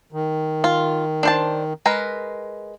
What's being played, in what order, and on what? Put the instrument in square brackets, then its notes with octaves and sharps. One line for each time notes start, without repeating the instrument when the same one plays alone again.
[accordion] D#3
[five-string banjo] F4
D4 C5 A5
G#3 A#4 B4